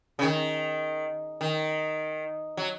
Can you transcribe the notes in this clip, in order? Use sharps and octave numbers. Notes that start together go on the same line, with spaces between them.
C#3
D#3
D#3
F#3